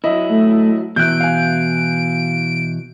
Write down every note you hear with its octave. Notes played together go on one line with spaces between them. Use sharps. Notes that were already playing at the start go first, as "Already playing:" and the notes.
F#3 E4 D#5 E5
A3
B2 E3 E5 F#6 G6 D7
F5 G#5